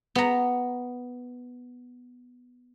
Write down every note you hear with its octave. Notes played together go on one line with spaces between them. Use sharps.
B3 A#5